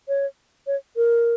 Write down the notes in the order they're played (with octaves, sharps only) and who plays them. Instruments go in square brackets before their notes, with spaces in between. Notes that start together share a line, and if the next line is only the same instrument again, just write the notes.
[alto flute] C#5
C#5
A#4